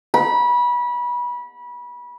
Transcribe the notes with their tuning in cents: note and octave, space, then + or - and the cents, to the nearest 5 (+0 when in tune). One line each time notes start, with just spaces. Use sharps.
B5 -25